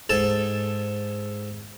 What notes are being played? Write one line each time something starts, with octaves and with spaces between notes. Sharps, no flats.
G#2 A4 A5